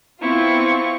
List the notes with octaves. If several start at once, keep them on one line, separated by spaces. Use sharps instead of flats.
B3 C4 E4 F4 C#6